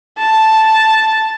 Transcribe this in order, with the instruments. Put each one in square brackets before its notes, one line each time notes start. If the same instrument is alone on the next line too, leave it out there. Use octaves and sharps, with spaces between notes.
[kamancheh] A5